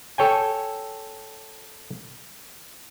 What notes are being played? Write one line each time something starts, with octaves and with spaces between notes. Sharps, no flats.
A4 C#5 G5 G#5